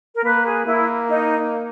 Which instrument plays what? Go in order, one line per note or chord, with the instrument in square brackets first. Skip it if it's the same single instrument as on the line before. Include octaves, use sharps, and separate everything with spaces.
[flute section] A#4
[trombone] A#3 [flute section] B4
[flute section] G#4
[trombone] A#3 [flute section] E4
[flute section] D#4